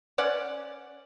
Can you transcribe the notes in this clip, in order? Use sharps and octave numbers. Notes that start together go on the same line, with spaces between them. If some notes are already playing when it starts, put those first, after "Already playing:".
C#4 D5 F#5